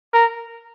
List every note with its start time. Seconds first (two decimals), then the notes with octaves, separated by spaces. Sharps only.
0.14 A#4